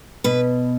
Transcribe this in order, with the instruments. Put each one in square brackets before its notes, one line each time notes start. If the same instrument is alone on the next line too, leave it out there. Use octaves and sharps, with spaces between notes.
[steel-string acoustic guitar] B2 B4